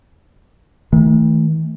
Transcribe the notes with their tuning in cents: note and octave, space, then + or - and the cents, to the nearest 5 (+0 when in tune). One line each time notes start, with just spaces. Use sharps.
D#3 +45 A3 +0